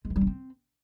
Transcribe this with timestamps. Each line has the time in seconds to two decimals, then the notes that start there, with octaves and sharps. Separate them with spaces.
0.05 G#3
0.10 E3
0.16 G3
0.21 D4
0.27 C4